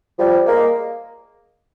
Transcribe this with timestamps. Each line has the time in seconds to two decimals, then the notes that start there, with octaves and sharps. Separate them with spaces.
0.18 F3 G3
0.46 G#3 A#3